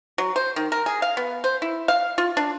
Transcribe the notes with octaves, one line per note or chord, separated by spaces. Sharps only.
F#3
C5
D#3
A#4
G#4
F5
B3
C5
E4
F5
F4
D4